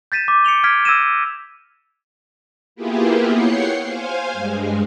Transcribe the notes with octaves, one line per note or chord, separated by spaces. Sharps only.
G6 A6 B6 D#7 E7
D6
C#7 D7 F7 G7
F6 G#6 B6 D7
E6 G#6 A#6 D#7 E7
A#3 B3 E4 F4 G4 G#4
C#5 F#5 G5 C#6 C7
C5 F5 G#5
G2 G#3